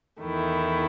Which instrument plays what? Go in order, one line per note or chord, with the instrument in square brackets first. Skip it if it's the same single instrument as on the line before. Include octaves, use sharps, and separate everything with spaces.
[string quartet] E2 D#3 A3 E4